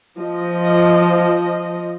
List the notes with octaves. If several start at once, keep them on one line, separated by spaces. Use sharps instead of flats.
F3 D#5